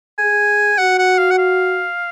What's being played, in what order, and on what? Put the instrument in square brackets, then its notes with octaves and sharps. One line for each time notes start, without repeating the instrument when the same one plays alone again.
[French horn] G#4 [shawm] G#5
[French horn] F#4 [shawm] F#5
[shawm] F#5
F5
F#5
F5